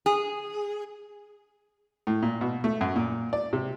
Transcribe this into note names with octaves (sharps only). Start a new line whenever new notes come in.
G#4
A2
A#2
B2
A3
F#2
A#2
D5
C3